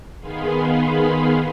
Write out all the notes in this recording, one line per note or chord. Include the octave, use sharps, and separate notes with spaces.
D#3 B3 G#4 F5 B5 C6